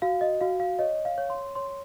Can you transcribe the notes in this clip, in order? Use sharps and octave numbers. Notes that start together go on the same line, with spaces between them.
F#4 F5
D#5
F#4 F5
F5
C#5 D#5
F5
C#5
C6
C#5 C6
C6